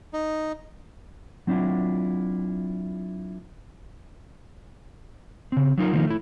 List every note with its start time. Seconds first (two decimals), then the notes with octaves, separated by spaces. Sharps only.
0.13 D#4
1.47 F#3 C4 D4 E4 F4
5.52 C#3 C4
5.78 F#3 D#4 F4 A#4
5.93 D#3 F3 A3 A#3 D#4 F4
6.07 A3 E4